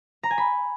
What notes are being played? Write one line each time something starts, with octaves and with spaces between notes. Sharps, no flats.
A#5
G#5
B5